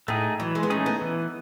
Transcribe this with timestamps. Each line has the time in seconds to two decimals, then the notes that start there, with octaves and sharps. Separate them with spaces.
0.08 A2 A3 D#4 G#4
0.39 E3 F#3
0.55 G#3
0.63 B3
0.70 A3 C#4 D#4 G#4
0.86 B3
1.01 E3